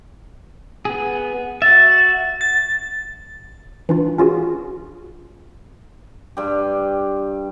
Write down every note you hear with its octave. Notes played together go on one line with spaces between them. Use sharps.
B3 G#4
F#4 E5 A6
A6
E3 D4 F4
C#4 F4 F#4 G#4
G2 G4